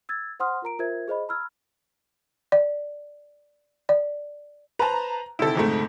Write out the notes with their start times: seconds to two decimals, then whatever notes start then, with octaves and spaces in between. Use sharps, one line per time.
0.09 E6 G#6 A6
0.40 C5 F#5 C6 D#6 F6
0.62 F4 A#4 A#5 D7
0.79 F4 A#4 C5 E5 G#6
1.08 G#4 C5 D#5 B5
1.28 A#5 B5 E6 F6 G#6
2.52 D5
3.89 D5
4.79 B4 C5 A5 A#5
5.39 D2 C3 D#3 E4 A4
5.55 F2 G#2 A3